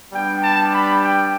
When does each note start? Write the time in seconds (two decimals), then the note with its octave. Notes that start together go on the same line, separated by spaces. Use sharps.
0.13 G3 B3 D4 G4 G5
0.43 A5
0.73 B5
1.02 G5